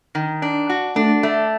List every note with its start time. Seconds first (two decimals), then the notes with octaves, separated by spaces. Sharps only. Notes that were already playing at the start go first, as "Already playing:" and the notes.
0.15 D#3
0.42 D4
0.69 F#4
0.96 A3 D4
1.23 A3